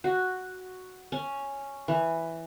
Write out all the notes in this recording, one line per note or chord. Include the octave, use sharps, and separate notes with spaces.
F#4
C#4
E3